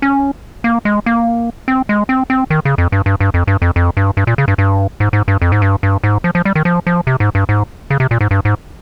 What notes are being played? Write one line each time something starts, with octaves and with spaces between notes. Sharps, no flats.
C#4
A#3
G#3
A#3
C4
G#3
C4
C4
D#3
C#3
F2
G2
G2
G2
F2
G2
F2
F2
G2
G2
A#2
C#3
G2
G2
G#2
G#2
G2
F2
G#2
G2
G2
G#2
F3
F3
G3
D#3
F3
F3
C3
G#2
G2
G#2
C#3
C3
A#2
G#2
G2
G#2